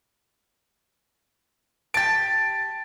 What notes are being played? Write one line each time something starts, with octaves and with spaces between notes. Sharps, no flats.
G4 A5 A6 D7